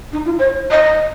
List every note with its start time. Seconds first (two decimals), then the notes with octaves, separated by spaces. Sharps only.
0.13 D#4
0.25 F4
0.39 C#5
0.71 D#5